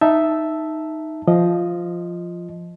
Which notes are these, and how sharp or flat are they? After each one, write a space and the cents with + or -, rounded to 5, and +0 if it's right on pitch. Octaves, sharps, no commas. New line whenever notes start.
D#4 +0 E5 +0 A5 +0
F3 -5 D#5 +0